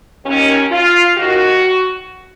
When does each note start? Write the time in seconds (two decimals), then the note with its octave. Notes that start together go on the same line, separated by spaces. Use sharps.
0.25 D#2 D#3 C#4
0.72 F4
1.18 D#2 D#3 F#4